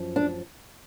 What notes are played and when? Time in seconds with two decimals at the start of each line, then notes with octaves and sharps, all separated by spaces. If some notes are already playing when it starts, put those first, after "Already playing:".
Already playing: F#2 F3
0.16 D4